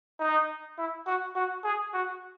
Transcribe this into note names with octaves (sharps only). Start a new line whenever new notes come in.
D#4
E4
F#4
F#4
G#4
F#4